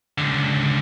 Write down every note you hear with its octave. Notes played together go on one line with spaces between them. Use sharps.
C#2 D3